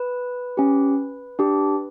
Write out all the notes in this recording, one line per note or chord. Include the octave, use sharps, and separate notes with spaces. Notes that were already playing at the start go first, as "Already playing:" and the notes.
Already playing: B4
C#4 G4
D4 G4